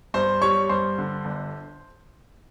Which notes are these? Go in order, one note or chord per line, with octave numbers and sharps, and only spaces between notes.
G2 C5 C6
G3 C#5 C#6
G2 C5 C6
D3
G1